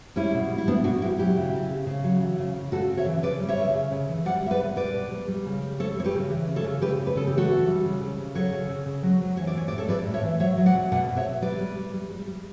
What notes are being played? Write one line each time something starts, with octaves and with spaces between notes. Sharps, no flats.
G3 C#4 E4
B2
G3
E4
G3 B3 D4
B2 D4 F#4
G3 E4 G4
F#3 E4 G4
C#3
C#3
C#3
C#3
F#3
E3
C#3
C#3
C#3 F#4 A4
C#3
C#5 E5
E3
C#3 B4 D5
G3
C#5 E5
C#3
C#3
C#3
E3
G3 D5 F#5
G3 E5
B4 D5
B2
G3 B4 D5
B2
G3
G3
C#3
G3
G3 A4 C#5
G3 C#5
G4 B4
C#3
E3
C#3
A4 C#5
C#3
C#3 G4 B4
C#3
B4
C#3 A4
G4
E3
F#4 A4
E3
G3
C#3
C#3
C#3
F#3 A4 C#5
C#3
C#3
C#3
F#3
F#3
E3 C#5
D5
E3 C#5
A2 D5
A4 C#5
G3 B4 D5
A2
C#5 E5
E3
F#3 C#5 E5
F#3
D5 F#5
B2
B2 D5 F#5
B2
C#5 E5
B2
G3 B4 D5
G3
G3
G3
G3
G3